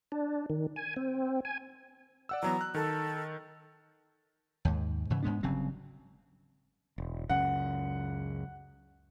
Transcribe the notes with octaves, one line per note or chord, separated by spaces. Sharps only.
D4
D#3
G#5
C4
G#5
D5 F#5 E6
E3 F#3 B3 A#5
F#6
D#3 A4
D#2 G#2
G#2 C#3 E3
G#2 G#3 B3 D4
G1 C#3 F#3 C4
E1
C#2 F#2 C#3 F#5